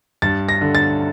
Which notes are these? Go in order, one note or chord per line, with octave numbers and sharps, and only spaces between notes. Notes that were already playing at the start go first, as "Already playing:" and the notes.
G2 A6
A#6
D3
A6